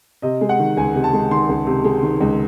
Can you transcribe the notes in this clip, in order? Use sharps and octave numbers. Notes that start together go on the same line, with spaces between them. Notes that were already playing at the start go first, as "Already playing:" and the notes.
C3 D#5
G#3
F#5
D#3
C#2 G#5
C3
A5
G#3
D#3 C6
C#2
C3
G#3
D#3
C#2